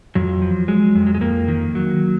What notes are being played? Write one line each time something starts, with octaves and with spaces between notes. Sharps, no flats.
F2 F#3
F3
F#3 G#3
F2
F#3
G#3
F2 A#3
D#3
F#3